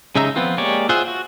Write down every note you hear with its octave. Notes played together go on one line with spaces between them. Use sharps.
C#3 G#3 D#4 E5 A#5
F3 B3 C4 F4
G#3 A#3 G4 C#5 D5
F4 G#4 C5 E5 F#5
F#4